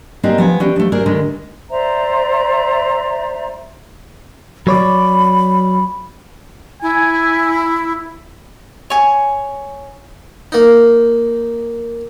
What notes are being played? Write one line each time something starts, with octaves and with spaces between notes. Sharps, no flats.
A#3 C4 D4 D#4 G4 G#4
F3 B3 G#5
E3 C#4 D4 G4
F3 A3
D4 G#4 A#4 C5 D5
D2 D3 D#3 G#3
C5 D5 E5 A#5
F#3 C#5 D5 B5
E4 G#5
C#5 G#5
A#3 D#4